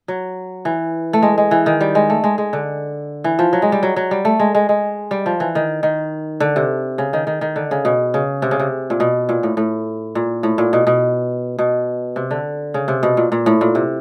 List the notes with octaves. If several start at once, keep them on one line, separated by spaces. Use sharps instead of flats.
F#3
E3
A3
G#3
G#3
E3
D#3
G3
G#3
A3
G#3
G#3
D3
E3
F3
F#3
G#3
G3
F#3
F#3
G3
A3
G#3
G#3
G#3
G3
F3
E3
D#3
D#3
D3
C3
C#3
D#3
D#3
D#3
D3
C#3
B2
C#3
C3
C#3
C3
A#2
B2
A#2
A2
A2
A#2
A2
A#2
B2
B2
B2
C3
D3
C#3
C3
B2
A#2
A#2
A2
A#2
C3